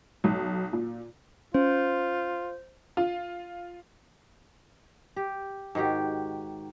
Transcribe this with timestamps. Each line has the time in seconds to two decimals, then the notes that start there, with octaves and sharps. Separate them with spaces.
0.24 B1
0.73 A#2
1.54 C#4 F4 C5
2.97 F4
5.16 G4
5.75 G#2 D#3 F#4 G4